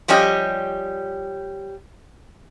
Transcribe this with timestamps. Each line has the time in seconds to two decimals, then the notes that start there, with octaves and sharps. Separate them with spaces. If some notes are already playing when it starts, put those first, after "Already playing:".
0.08 F3 G3 C#4 G4 D#5